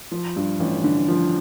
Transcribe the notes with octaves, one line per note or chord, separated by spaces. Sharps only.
F3
G2
A1
D3
F3